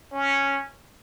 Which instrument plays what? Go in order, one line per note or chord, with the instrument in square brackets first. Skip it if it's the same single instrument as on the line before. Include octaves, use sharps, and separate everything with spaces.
[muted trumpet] C#4